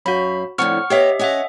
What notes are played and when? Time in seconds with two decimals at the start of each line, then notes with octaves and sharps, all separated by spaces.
0.06 F#2 F#4 E5 F5 B5
0.58 F2 A2 D3 F#5 C#6 F6
0.90 B3 G4 C#5 D#5 E5 G5
1.19 C#4 D#5 E5 F#5 G#5